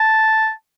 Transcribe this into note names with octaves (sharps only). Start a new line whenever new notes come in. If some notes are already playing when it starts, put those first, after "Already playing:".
Already playing: A5